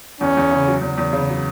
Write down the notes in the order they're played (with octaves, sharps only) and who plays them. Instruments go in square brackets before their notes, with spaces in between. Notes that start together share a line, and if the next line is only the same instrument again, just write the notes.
[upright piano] E2 [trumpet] C#4
[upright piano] E2
C#3
F#3
E2
E2
C#3
F#3